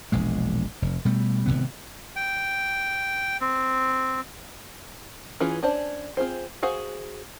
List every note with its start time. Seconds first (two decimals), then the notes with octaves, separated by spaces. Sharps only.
0.12 E1 A#1 G#3
0.82 F1
1.05 B2 G3 A3
1.46 G#1 F2 C3 B3
2.16 G5
3.41 C4
5.40 E3 C#4 F4 G#4 B4
5.63 C#4 D4 C5 D5 A5
6.17 C4 F4 G#4 C5
6.63 F#4 G#4 C5 F5